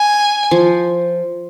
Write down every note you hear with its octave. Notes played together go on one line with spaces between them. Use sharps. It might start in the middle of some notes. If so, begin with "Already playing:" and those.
Already playing: G#5
F3